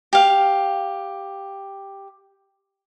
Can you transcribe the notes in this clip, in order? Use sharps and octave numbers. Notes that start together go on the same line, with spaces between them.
G4 F5